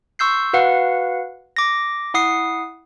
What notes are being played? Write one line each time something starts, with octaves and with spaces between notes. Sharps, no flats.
C6 C#6 E6 G6 C7
F#4 B4 F5 F#5
D6 A#6
E4 F#5 D#6 C7